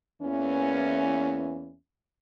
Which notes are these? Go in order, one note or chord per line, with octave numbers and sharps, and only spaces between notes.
E2 E3 A#3 C#4